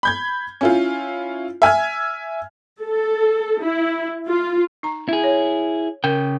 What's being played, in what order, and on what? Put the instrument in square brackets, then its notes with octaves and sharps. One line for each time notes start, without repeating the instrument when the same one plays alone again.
[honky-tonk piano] B5 G6 G#6
C#4 E4 F4
E5 G#5 F6 G#6
[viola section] A4
E4
F4
[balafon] D#4 A#5
[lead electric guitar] E4 G#4
[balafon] C#5
[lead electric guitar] C#3 G5 [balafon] A#4